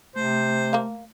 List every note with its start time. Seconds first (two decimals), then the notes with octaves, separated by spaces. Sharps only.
0.16 C3 A3 C5
0.73 A#3 F5